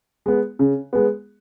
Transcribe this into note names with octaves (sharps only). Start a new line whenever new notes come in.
G#3 B3
C#3
G#3 B3